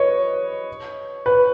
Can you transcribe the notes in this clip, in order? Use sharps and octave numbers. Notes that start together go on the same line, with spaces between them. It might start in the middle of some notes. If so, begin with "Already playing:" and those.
Already playing: B4 C#5 D#5
B4